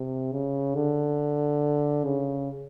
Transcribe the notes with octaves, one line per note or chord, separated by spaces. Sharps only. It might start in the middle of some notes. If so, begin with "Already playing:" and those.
Already playing: C3
C#3
D3
C#3